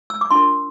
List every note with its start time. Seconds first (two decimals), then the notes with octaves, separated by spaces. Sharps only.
0.10 E6
0.21 D6
0.31 D4 F4 A#4 C6